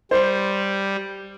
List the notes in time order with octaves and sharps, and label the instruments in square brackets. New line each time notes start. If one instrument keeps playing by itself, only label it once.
[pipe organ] G3 [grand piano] C5